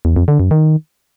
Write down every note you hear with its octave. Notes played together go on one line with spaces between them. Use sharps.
E2
F2
D3
F#2
D#3